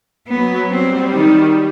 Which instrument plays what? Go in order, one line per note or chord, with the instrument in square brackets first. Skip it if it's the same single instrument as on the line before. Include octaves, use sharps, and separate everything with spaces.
[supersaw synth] F#3 [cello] B3
[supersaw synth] G3 [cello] C4
[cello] D#3